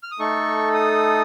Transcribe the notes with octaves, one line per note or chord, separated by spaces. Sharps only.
F6
D#6
A3 D#4 A4 C#6
D#6